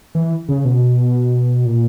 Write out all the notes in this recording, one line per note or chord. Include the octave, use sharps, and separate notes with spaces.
E3
C#3
B2
A#2